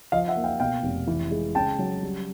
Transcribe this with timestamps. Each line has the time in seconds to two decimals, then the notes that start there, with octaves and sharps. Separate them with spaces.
0.12 F3 D#5 F5
0.28 E5 F#5
0.36 A#3
0.44 F5 G5
0.60 B2 F5 G5
0.83 F1
1.07 E3
1.31 G#3
1.55 C#3 G5 A5
1.79 F#3
2.03 G3